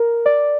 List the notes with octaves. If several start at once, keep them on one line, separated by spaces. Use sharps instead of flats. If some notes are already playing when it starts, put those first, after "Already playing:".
Already playing: A#4
D5